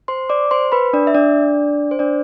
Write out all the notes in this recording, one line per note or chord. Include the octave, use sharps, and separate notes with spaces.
C5 C6
D5 D6
C5 C6
B4 B5
D4 D5
E5
D4 D5
C5
D4 D5